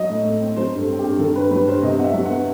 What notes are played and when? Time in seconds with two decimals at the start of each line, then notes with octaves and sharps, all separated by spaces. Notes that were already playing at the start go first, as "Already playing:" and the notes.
Already playing: F#3 D#5
0.09 A2
0.24 A3
0.41 C4
0.56 F#3 C5
0.72 G2
0.77 A4
0.88 C4
0.99 G4
1.03 G2
1.19 D#3 A4
1.36 G2 B4
1.51 F#3 B4
1.67 G2 C5
1.82 C3 D#5
1.99 E2 F#5
2.04 E5
2.14 F#3
2.25 F#5
2.30 B3